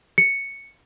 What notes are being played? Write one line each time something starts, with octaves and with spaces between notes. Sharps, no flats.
C#7